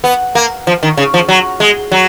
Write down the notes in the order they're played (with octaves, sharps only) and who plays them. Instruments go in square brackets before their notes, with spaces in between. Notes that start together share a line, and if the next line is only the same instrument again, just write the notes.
[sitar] B3
A#3
F3
D#3
C#3
F3
F#3
G#3
F#3